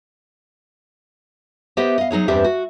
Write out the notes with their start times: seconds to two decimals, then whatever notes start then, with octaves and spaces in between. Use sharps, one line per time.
1.77 B3 G4 C5 D#5 E5
1.98 D#5 F5
2.11 F#3 D#4 G#4 C#5
2.28 E2 G2 C4 D4 G4 E5
2.44 F#4